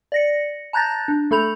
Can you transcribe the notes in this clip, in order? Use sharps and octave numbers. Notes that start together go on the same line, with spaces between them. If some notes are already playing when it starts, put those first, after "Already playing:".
D5 A#6 C#7
A5 A#5 F#6 G6 A6 A#6
D4
A3 A4 B5 G6 F7